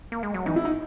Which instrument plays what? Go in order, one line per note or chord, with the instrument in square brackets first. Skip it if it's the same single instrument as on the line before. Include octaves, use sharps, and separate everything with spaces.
[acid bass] A#3
G#3
F#3
[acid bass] E3 [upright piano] D#4
[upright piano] E4
D#4